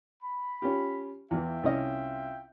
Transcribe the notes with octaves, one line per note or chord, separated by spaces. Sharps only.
B5
C#4 F4 G4
E2 E3 F4 E5 G5
C2 C#4 D#5